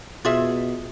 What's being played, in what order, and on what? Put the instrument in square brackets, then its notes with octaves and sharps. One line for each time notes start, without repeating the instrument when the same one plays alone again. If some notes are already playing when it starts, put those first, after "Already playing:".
[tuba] B2 [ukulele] F4 G#4 E5